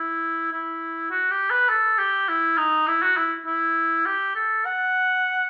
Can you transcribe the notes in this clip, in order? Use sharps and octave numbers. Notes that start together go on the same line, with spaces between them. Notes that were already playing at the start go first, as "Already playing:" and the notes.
Already playing: E4
E4
F#4
G4
B4
A4
G4
E4
D#4
E4
F#4
E4
E4
G4
A4
F#5